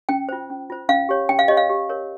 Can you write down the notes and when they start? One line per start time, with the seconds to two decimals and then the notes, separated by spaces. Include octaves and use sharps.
0.09 C#4 G5
0.29 F4 C5
0.50 C#4
0.70 F4 C5
0.89 C#4 F5
1.09 G4 C#5
1.29 C#4 G5
1.39 F5
1.48 G4 C#5 D#5
1.57 F5
1.69 G4
1.89 A#4 C#5